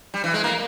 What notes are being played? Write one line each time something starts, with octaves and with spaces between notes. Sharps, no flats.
G3
E3
G#3
A#3